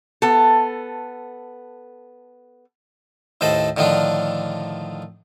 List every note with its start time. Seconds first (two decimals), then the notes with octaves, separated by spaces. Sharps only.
0.22 B3 A4
3.41 D#2 A2 C5 D#5 A5 B5
3.77 A2 D3 D#3 F3 D4